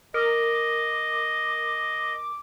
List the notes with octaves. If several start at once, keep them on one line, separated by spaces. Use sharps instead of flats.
A#4 D#5 D6